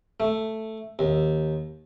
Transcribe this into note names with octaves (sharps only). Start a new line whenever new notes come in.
A3
D#2